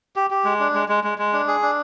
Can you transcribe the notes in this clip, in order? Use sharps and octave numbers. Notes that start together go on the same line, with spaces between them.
G4
G4
G#3
D4
G#3
G#3
G#3
G#3
D4
G#4
D4